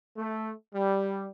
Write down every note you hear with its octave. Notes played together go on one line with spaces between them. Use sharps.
A3
G3